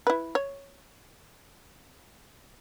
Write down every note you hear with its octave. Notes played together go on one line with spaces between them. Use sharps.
E4 B4
C#5